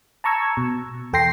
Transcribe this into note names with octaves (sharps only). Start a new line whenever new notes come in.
A5 A#5 C#6 E6 G#6
B2
E2 A4 G5 C6 A#6 C7